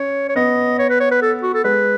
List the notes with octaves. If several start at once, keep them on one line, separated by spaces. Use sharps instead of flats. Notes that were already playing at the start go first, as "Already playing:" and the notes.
Already playing: C#4 C#5
C#5
B3 D#5
C#5
B4
C#5
B4
A4
F#4
A4
G#3 B4